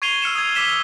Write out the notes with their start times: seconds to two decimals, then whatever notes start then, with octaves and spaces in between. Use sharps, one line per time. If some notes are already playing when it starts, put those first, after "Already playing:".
0.02 C#6 G#6 C7 D#7 F7 G7
0.22 E6 F6 C#7 E7
0.35 D#6 G#6
0.55 D6 E6 B6 E7 G7
0.68 E6